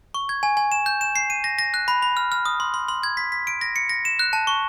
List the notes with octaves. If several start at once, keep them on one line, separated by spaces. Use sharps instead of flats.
C#6
G#6
G#5
G#5
E7
G6
E7
C7
D#7
A#6
A#6
F#6
B5
B5
F6
F6
D#6
C6
C6
C6
G#6
B6
B6
D7
A#6
C#7
A#6
E7
F#6
A5
C#6